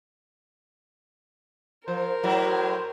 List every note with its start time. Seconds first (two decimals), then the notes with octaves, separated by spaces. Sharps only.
1.88 F3 A#4 C5
2.23 A2 F#3 E4